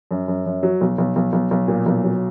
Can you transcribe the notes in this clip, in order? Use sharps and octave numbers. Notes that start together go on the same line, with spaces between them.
F#2
F#2
F#2
F#3
B1
B1
B1
B1
B1
A#2
B1
F#3